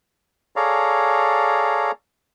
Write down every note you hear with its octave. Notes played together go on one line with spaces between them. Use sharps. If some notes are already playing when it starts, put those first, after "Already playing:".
G#4 A4 C#5 D5 F5 A#5